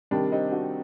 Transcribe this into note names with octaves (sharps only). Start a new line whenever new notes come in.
C3 D#3 G3 D4
C4 D#4
D4 F#4